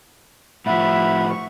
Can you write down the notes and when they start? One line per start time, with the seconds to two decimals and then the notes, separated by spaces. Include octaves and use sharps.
0.66 A2 F3 E5 F#5 B5
1.30 C#6